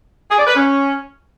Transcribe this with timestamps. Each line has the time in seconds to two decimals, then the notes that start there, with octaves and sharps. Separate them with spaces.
0.30 G#4
0.38 D5
0.47 B4
0.55 C#4